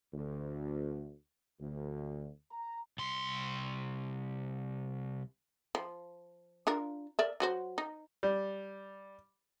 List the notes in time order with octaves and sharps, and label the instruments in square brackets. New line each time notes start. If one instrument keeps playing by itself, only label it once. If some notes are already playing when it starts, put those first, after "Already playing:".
[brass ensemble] D2
D2
A#5
[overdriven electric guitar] C2 C6
[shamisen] F3
D4 F4 A#4
A#4 D5 E5
F#3 F#4 C5
D#4
[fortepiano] G3